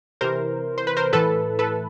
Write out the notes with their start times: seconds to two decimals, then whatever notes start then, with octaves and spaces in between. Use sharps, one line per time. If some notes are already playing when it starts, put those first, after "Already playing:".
0.21 C3 E3 A#4 C5
0.78 C5
0.87 B4
0.97 A#4 C5
1.12 A2 E3 A4 B4
1.59 A4 B4